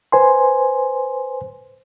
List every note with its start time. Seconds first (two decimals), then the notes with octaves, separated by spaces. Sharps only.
0.12 B4 C5 G#5 C6